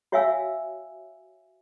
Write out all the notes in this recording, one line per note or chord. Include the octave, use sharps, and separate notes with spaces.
F#4 C#5 E5 F5 G#5 E6